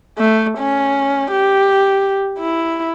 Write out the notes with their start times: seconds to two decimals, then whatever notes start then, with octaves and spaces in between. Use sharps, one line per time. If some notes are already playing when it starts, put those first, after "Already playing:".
0.19 A3
0.59 C#4
1.31 G4
2.39 E4